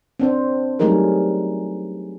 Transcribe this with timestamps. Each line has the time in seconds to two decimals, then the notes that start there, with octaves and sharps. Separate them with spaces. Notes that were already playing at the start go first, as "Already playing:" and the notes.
0.20 C4 D4 C5
0.79 F#3 G3 A3 D#4 G#4 A#4